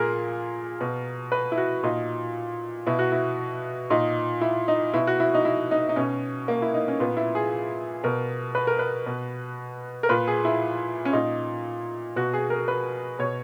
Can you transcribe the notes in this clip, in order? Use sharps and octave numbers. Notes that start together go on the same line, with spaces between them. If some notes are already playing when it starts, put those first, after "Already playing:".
Already playing: A#2 G#4 A#4
B2
B4
E4
F#4
A#2 D#4
B2 E4
F#4
E4
A#2 D#4
E4
D#4
B2 E4
F#4
E4
D#4
E4
D#4
D#4
B2 C#4
A#3
E4
D#4
C#4
A#2 B3
E4
G#4
B2 A#4
B4
A#4
B4
B2
A#4
A#2 B4
G#4
E4
C#4
A#2 D#4
B2 F#4
G#4
A#4
B4
B2 C#5